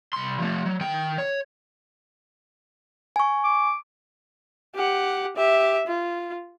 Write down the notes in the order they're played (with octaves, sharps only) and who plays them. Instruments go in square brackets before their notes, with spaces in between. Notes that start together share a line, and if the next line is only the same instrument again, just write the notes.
[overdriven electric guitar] C2 C6
F3 A3
F#3
D#3 G5
C#5
[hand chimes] G#5 C#6
[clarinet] D6
[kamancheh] G4 F#5
G4 E5
F4